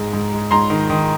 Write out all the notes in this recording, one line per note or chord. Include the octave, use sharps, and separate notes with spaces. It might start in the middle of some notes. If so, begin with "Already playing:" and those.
Already playing: G#2 G#3 A#5
G#2
G#3
G#2 A#5 C6
D#3
D#3